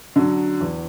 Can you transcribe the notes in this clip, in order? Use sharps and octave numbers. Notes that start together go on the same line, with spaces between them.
D3 F#3
E2